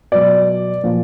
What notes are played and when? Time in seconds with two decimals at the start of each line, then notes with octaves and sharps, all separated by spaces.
0.12 B2 F#3 D5
0.84 A#2 F3